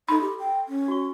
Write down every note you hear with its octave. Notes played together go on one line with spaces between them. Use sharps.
D#4 A4 B5 C6
G4
G5
C#4
F#4 C#6